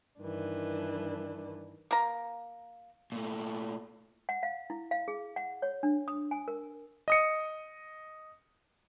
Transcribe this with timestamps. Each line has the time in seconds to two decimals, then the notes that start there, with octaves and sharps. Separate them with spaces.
0.20 G2 D#3 E3 D4
1.91 A#3 A#5
3.12 A#2 A3
4.29 F#5
4.43 F5
4.70 E4
4.91 F5
5.08 G#4
5.36 F#5
5.62 C#5
5.83 D4
6.08 D#6
6.31 G#5
6.48 A#4
7.08 D#5 D#6 C#7